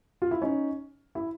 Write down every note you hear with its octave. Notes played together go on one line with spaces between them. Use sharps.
F4
E4
C#4 D#4
E4